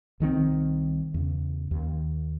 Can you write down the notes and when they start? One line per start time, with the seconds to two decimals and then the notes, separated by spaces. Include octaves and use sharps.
0.20 C2 D#3 F3 C4
1.14 E2 C#3
1.71 D#2